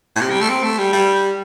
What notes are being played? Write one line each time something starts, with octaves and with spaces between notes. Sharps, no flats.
A2
C3
G3
A3
C4
A3
G3
G3